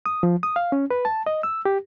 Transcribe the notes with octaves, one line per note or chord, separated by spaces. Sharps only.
D#6
F3
D#6
F5
C#4
B4
A5
D#5
E6
G4